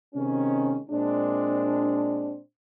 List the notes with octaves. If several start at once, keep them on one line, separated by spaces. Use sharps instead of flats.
C3 D#3 G#3 C#4
A#2 G#3 C4 D4